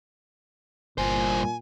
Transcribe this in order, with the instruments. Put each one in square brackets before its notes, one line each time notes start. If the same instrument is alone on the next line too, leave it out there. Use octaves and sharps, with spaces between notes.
[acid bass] G1 [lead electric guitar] G2 C5 [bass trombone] A#2 [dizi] G#5